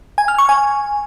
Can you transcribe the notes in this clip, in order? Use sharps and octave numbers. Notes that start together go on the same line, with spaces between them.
G#5
F6
C#6
G#5